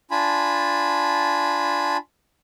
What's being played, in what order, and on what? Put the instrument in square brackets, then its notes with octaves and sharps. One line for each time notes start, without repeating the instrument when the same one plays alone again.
[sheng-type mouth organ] D4 F4 G#5 A5 B5